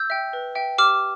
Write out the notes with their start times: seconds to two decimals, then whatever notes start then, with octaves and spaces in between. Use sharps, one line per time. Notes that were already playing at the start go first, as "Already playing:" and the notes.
Already playing: E6 G6
0.10 E5 G5
0.33 B4
0.55 E5 G5
0.78 G4 D6 F6